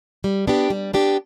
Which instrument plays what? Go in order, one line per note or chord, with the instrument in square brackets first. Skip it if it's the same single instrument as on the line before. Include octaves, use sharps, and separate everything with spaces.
[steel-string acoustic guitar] G3
B3 D4 G4
G3
B3 D4 G4